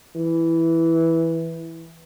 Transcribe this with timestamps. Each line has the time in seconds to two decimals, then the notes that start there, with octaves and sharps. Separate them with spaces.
0.16 E3